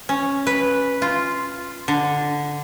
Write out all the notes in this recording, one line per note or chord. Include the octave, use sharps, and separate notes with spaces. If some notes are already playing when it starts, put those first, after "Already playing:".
C#4
B4
F4
D3